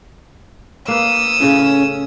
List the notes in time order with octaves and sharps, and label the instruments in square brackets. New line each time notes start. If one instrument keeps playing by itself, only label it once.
[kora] A#3 B4 [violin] D#6 E6
[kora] A2 C#3 [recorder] C#4